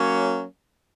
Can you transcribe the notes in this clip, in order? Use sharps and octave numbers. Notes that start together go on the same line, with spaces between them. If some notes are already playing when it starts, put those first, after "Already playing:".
Already playing: F#3 A#3 C#4